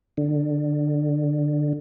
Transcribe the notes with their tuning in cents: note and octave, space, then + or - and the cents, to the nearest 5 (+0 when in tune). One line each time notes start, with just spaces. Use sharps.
D3 +15